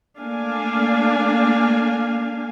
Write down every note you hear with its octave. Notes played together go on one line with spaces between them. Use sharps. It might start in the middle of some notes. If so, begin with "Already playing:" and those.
A3 A#3 D4 F5 G#5